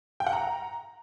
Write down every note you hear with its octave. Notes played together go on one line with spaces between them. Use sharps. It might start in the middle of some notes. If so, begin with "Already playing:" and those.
G5
F#5
A#5